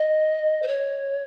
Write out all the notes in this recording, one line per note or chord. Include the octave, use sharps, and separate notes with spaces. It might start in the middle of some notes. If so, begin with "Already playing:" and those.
Already playing: D#5
C5
C#5